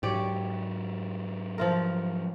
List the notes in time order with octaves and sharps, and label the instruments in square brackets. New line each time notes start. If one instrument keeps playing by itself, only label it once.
[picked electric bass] G#2 F#3 [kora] G4 C#5 D5
[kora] F3 F4 A#4